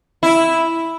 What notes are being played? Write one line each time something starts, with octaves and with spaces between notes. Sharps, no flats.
E4